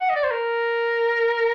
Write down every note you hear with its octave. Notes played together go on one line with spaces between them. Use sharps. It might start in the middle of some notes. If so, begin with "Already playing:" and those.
F#5
D#5
D5
C5
A#4